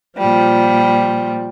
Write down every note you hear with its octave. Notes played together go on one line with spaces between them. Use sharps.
A#2 F3 G3